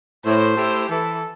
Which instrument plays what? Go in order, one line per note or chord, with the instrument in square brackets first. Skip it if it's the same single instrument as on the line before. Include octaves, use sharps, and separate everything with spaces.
[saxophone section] A2 [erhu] C5
[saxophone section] A3 E4 G4
[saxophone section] E3 [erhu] A4